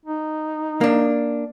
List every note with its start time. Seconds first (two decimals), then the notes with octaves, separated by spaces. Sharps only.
0.05 D#4
0.81 A#3 D4